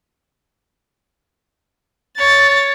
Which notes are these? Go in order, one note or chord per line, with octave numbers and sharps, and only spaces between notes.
C#5 A6